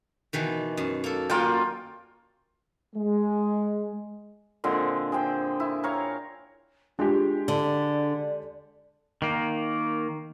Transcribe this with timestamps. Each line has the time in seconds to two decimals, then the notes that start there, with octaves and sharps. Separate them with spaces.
0.33 B2 D#3 E3
0.77 F#2
1.04 A#3 A4
1.30 A#3 C#4 F4 F#4 D5 G5
2.96 G#3
4.64 A#2 D3 G#3 C4
5.12 G#4 C5 G5
5.60 E4
5.84 A#4 C#5 F5
6.99 G#3 D4 F4 G4 G#4
7.48 D3 D5
9.22 D#3 A#3